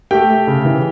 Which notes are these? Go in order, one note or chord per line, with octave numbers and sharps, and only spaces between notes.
A3 G4 G5
A3
C#3
E3